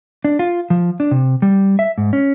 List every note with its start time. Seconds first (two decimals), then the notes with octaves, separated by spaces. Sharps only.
0.24 D4
0.39 F4
0.70 F3
1.00 D4
1.11 C3
1.42 G3
1.79 E5
1.98 G#2
2.13 C#4